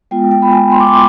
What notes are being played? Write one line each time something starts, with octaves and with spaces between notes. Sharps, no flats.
G#3 B3 F4 G5
G5
B5
G#5
C6
D6
C6